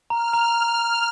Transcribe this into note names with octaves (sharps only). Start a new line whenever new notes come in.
A#5 F6
A#5